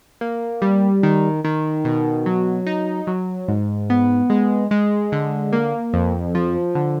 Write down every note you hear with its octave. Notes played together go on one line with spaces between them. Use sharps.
A#3
G3
D#3
D#3
B2
F#3
D#4
F#3
G#2
B3
G#3
G#3
D3
A#3
F2
F3
D3